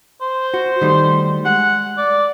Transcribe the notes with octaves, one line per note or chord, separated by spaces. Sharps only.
C5
F#4
D#3 G3 A3
G#3 F#5
D5